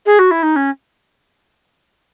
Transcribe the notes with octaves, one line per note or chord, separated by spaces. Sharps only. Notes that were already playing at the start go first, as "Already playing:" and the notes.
G#4
F#4
E4
D#4
C#4